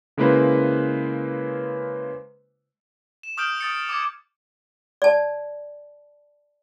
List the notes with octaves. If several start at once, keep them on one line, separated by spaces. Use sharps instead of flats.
C#3 G#3 A#3 E4 B4 C5
E7
C#6 D#6 F6 G6 D7 F#7
D#6 A6 C#7
D6 G#6
D5 A5